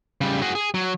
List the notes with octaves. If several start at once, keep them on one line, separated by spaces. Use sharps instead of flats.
C#3 G3
F#4 G#4
G#4
F#3